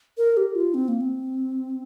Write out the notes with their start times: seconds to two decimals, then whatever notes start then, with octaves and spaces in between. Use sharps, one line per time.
0.18 A#4
0.37 G4
0.55 F4
0.74 C4
0.88 A#3
1.01 C4